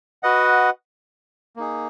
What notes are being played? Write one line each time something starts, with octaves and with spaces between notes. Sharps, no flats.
F#4 B4 D#5 F#5
A#3 D#4 G#4